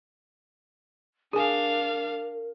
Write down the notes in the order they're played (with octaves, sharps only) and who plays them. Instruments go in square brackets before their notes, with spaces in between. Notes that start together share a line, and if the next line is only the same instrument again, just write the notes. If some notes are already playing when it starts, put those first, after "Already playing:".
[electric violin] D4 F5 [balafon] G#4 G#5 [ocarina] A#4